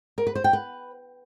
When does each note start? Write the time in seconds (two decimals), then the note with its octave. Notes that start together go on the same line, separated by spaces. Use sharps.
0.18 A#4
0.27 B4
0.35 C5
0.44 G5
0.53 B4